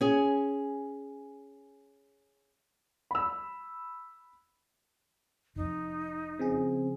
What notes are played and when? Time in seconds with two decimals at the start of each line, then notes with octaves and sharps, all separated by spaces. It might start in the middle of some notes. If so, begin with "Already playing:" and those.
0.01 C#4 G#4
3.11 B5 E6
5.56 F1 F2 D#4
6.39 C#3 F3 C4 G#4